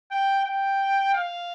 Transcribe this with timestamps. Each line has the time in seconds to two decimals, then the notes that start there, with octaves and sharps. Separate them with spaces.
0.11 G5
0.45 G5
1.14 F5